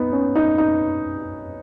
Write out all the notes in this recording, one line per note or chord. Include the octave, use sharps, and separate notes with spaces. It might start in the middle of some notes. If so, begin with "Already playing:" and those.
Already playing: B3 D#4
C#4
D#4
D#4